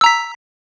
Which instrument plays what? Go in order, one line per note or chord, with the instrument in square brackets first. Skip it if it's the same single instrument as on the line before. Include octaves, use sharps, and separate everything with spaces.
[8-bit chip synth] E6
A#5
B6